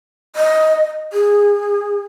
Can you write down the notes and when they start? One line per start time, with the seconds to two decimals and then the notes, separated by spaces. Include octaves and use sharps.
0.36 D#5
1.13 G#4